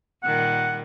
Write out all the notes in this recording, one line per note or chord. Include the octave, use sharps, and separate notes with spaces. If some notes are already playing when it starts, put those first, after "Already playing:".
A#2 D#3 G3 F#5